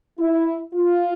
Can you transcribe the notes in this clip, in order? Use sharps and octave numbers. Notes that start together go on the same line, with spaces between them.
E4
F4